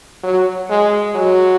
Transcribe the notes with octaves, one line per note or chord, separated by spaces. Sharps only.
F#3
G#3
F#3